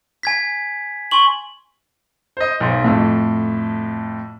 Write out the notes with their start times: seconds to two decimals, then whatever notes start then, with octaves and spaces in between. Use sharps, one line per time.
0.23 G#5 G#6 B6
1.11 G#5 C6 C#6 F#7
2.37 C5 D#5
2.61 B1 G#2
2.84 F2 A2